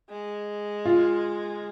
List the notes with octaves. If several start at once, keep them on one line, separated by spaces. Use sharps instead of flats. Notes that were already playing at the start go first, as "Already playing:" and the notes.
G#3
F4